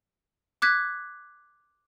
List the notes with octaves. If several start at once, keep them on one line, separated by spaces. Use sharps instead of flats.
D6 F#6 G#6 B6